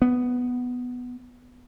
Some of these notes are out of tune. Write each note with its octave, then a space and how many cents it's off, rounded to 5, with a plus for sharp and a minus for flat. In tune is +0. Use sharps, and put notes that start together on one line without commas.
B3 +5